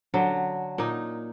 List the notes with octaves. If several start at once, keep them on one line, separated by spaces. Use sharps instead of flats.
D3 F#3
A#2 D#4